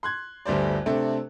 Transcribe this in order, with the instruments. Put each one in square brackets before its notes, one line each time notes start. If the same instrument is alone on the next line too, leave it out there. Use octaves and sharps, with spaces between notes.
[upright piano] C6 F#6 G#6
G1 D2 G3 C5 D5
C3 A3 C4 D4 A4